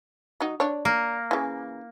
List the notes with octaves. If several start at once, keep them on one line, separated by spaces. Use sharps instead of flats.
F#3 D#4
D4 C#5
A#3
C#3 E3